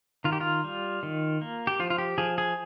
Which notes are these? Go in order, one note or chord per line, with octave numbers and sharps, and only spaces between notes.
D#3 F4
G4
F4
G3
D#3
A#3
G4
F3 F4
F4
G4
F3 G#4
G#4